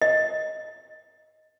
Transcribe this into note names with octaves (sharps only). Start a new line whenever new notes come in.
D#5